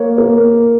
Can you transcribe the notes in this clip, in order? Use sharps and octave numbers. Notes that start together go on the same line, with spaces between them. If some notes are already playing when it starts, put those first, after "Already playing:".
Already playing: A#3 C#5
A#3